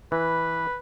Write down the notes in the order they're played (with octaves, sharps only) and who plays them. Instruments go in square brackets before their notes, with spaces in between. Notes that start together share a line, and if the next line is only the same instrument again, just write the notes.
[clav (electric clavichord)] E3 [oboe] B4